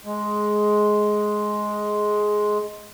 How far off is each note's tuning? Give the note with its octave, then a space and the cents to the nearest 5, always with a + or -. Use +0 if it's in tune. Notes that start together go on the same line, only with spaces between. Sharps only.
G#3 +10